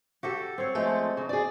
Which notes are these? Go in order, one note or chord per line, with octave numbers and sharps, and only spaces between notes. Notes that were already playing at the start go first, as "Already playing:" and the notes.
F#4 G4 A4
C4 C#5
F3 G#3 A3
C#3
G#4 D5